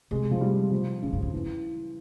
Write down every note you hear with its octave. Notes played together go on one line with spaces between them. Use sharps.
C3 G#3
F3
G3
F3
A#2 C#3
G2
F2
E3